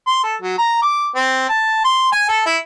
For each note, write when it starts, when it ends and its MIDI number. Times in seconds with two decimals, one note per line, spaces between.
0.07 0.22 84
0.23 0.36 69
0.42 0.56 54
0.58 0.80 82
0.82 1.09 86
1.15 1.46 60
1.49 1.81 81
1.84 2.08 84
2.12 2.25 80
2.28 2.45 69
2.46 2.57 64